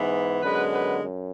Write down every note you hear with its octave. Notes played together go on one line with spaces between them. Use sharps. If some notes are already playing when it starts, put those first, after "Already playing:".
Already playing: G#2 E3 B3
F#2 D3 G#3 B3 B4
B4
F#2